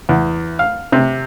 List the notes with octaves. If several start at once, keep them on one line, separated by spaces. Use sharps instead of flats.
E2
F5
C3